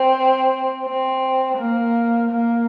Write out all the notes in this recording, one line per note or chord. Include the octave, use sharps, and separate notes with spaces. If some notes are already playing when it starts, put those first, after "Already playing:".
Already playing: C4
C4
A#3
A#3